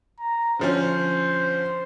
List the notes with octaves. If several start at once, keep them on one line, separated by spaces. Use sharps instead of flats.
A#5
D3 F3 C#4 C5